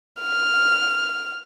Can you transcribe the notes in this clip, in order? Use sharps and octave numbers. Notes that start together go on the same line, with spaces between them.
F6